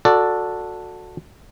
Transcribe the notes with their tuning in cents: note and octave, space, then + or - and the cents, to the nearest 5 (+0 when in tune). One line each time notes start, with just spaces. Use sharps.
F#4 -20 A4 +5 D5 +0